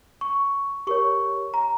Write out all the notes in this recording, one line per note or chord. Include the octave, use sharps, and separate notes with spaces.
C#6
G4 A#4 C#5 C#6
A#5